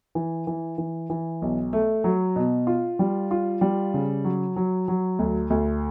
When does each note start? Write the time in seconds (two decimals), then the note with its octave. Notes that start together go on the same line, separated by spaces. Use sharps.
0.15 E3
0.47 E3
0.78 E3
1.10 E3
1.42 B1
1.73 A3
2.04 F#3
2.36 B2
2.67 F4
2.99 G3
3.31 F4
3.61 G3
3.94 C#3
4.24 F#3
4.56 F#3
4.88 F#3
5.19 D2
5.50 D2